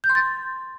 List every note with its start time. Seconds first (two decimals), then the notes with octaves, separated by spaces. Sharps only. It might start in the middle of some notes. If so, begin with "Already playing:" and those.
0.04 G6
0.09 C6
0.15 A6